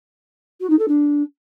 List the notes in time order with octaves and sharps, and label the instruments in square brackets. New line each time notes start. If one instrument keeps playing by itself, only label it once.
[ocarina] F#4
D#4
A4
D4